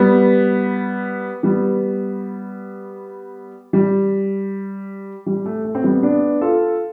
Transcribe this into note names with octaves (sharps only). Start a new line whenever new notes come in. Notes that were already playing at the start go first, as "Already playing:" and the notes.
Already playing: G3 B3
G3 B3
G3
G3
A3
A3
C4
G3 B3
B3 D4
F4 A4